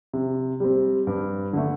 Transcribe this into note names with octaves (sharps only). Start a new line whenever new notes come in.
C3
G3 C4
G2
D3 A3